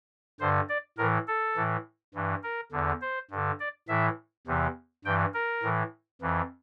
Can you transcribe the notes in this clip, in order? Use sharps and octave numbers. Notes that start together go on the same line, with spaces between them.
G2 D3 C5
D5
A2 E3 A#4
A4
A2 E3
G2 E3
A#4
E2 D3
C5
G2 D3
D5
A2 E3 E5
E2 C3 E3
G2 E3 G5
A#4
A2 E3
F2 E3